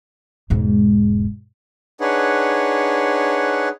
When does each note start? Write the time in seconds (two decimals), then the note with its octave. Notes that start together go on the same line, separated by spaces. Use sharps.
0.50 E1 G#2
2.01 D4 D#4 G#4 B4 C#5 F#5